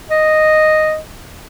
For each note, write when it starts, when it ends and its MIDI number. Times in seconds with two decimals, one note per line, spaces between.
0.10 0.98 75